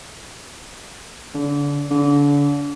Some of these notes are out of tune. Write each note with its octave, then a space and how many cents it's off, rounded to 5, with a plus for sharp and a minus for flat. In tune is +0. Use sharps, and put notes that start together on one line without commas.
D3 -30
D3 -35